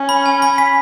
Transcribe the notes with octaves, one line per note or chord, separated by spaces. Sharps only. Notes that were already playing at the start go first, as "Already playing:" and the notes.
Already playing: C#4
B5
G#5
B5
B6